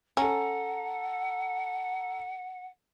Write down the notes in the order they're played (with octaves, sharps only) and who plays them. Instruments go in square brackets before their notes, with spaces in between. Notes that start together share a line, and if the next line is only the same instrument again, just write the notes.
[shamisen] C#4 [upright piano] A4 A#5 [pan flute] F#5